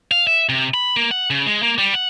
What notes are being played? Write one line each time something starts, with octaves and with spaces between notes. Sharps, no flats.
F5
E5
C3
B5
A#3
F#5
C#3
G#3
A#3
G3
F#5